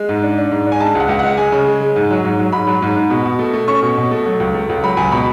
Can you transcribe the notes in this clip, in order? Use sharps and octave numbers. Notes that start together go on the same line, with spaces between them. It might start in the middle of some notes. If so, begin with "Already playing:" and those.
Already playing: G#3
G#2
D4
D4
G#2
D4
G#5
G#3 A5
C#2
F#5
C#2
G#3 F#5
G#3 G#5
C#3
G#3
G#3
G#2
F#3
G#2
F#3
G#2 B5
F#3
G#2
G#2
B2
B2
A3
A3
C#4 C#6
B2
B2
A3
F#3
C#2
A3
C#2
F#3 B5
C#2 G#5
B2 B5